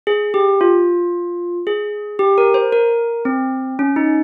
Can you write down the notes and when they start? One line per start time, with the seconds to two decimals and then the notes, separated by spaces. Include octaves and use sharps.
0.07 G#4
0.34 G4
0.61 F4
1.67 G#4
2.19 G4
2.38 A#4
2.54 C5
2.72 A#4
3.25 C4
3.79 C#4
3.96 D#4